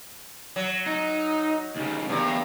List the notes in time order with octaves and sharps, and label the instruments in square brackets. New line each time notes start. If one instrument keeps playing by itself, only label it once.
[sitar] F#3
[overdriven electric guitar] D#4
D#2 C#3
[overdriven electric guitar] E2 A#3 [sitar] G2